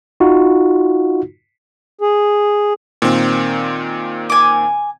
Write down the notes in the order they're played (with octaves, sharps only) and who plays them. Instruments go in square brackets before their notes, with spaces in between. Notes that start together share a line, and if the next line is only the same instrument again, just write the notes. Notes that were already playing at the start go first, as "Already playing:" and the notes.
[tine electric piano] D#4 F4 F#4
[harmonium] G#4
[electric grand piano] A#2 D#3 C4
[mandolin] G#5 D6